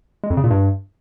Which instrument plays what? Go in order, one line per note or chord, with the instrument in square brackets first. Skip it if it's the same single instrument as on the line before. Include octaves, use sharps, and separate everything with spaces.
[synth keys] G#3
F2
C#3
A#2
G2